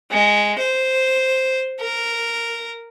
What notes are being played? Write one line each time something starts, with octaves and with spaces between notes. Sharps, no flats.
G#3
C5
A#4